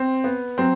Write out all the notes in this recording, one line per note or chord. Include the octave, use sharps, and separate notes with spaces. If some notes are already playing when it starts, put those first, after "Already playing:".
Already playing: C4
B3
F#3 C4